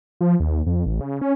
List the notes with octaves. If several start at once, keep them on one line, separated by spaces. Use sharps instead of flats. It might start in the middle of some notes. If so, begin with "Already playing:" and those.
F3
D#2
F2
A1
C#3
C#4